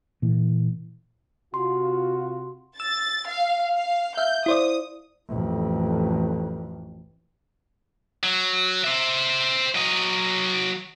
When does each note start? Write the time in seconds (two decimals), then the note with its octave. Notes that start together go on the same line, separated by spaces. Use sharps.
0.22 A#2 E3
1.54 C3 F4 F#4 C6
2.80 E6 A6
3.30 F5
3.74 F5
4.17 E5 F5 G6
4.46 E4 C5 D5 D#6
5.28 A1 F2
8.23 F#3
8.84 C5 E5
9.75 F#3 D#5